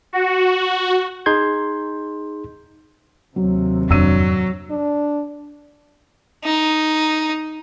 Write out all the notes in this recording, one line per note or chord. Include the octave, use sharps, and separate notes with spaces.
F#4
D#4 G#4 C6 G6 G#6
D#2 C3 F#3
F2 G#2 F#3 D4 E6 D#7
D4
D#4